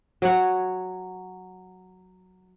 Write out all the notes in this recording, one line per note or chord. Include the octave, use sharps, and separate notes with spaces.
F#3 C#5 F#5